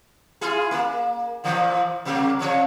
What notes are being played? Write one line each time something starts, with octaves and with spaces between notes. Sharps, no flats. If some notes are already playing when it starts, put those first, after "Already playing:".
E4 F4 G#4
A#3
A#2 E3 F3
C3 F#3 A#3
C3 F3 C#5